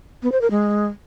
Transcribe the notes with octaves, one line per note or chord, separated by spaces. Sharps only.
B3
C5
A#4
G#3